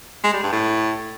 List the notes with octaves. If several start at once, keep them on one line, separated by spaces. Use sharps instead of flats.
G#3
G3
G2
A2